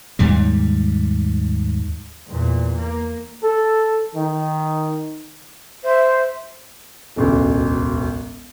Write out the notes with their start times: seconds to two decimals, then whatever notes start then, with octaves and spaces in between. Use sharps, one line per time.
0.19 D#2 G#2 G3
2.27 E2 A#2
2.76 A#3
3.44 A4
4.15 D#3
5.83 C5 E5
7.16 E1 A1 D2